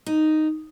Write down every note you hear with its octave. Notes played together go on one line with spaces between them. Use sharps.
D#4